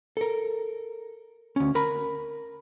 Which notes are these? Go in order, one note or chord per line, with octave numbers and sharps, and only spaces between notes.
A4 A#4
D2 C#4
A#4 B5